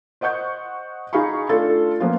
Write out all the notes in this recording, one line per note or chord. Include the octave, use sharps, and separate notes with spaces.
C5 D#5 F#5 C#6 G6
D#4 G#4 F5 B5 C#6
A3 D4 F4 A4
F3 A#3 B3 C#4 F4